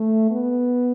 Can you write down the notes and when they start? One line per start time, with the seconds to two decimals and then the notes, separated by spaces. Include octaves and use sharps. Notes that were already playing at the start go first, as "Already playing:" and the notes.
Already playing: A3
0.30 B3